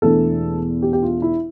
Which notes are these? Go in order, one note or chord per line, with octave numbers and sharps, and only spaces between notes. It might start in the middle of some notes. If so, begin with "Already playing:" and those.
E1 E2 E3 A3 D4 A4
G4
G4
F4
E4